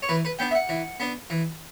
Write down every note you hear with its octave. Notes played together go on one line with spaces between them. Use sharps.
C#5
E3 B4
B4
B3 D4 G5
E5
F#5
E3
B3 D4
E3